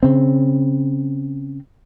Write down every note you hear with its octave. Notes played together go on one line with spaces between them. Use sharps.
C#3 C4